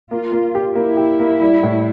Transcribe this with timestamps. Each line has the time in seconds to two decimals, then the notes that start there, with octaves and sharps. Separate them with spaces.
0.11 A#3 F4
0.32 A#3
0.55 G4
0.75 A#3 E4
0.97 G4
1.20 A#3
1.41 G3
1.63 A2